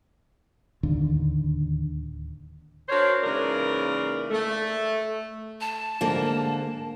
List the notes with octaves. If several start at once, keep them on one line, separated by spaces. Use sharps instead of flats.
D1 D#2 D3
D4 F#4 A#4 C5 C#5
G#2 C#3 E3 A#3 A#4 D5
A3
A5
G#2 D3 A#3